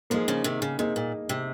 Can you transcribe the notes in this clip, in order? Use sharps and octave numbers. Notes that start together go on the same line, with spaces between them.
F3 G#3 A#3 D#4 G#4
C#3 F3
C3 D#3
C#3
C3 A#3 D#4 G#4
A#2
C3